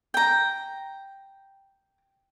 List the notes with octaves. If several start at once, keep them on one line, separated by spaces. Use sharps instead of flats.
G5 A#5